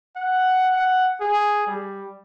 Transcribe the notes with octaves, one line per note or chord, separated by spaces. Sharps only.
F#5
F#5
G#4
G3